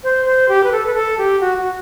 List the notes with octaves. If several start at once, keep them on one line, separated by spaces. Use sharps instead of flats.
C5
C5
G4
B4
A4
B4
A4
G4
F#4
F#4